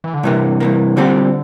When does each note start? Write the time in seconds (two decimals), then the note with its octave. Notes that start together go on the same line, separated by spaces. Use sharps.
0.04 E3
0.14 D3
0.23 G2 C3 E3 A#3
0.60 G2 E3 A#3
0.96 A#2 D3 G3 C4 G4